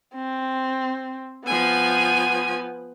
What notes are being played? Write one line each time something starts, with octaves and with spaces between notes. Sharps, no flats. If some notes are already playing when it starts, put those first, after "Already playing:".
C4
F3 B3 G#5